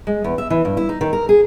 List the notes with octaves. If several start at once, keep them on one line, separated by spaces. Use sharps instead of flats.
G#3
E2
E5
E3
G2
E4
D#4
D#3
A#4
G#4